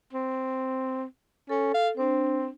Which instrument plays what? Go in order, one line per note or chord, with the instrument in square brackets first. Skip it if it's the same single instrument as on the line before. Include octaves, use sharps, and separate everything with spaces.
[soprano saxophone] C4
[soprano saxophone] C#4 [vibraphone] A4
[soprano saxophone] F5
[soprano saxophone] C4 [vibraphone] D4 C5